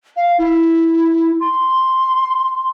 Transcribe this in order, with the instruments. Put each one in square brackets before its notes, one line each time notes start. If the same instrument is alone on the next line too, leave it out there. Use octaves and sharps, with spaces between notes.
[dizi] F5
E4
C6